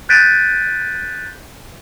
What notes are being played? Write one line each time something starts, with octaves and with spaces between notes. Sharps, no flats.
F#6 G6 A6 B6 D7 D#7